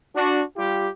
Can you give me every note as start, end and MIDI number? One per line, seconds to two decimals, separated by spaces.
0.16 0.42 62
0.16 0.42 66
0.57 0.87 55
0.57 0.87 65
0.57 0.87 67